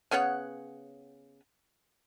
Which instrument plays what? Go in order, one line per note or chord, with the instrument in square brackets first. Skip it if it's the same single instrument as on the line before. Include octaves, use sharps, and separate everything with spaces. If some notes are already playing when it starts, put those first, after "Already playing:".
[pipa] C#3 B3 C#5 F#5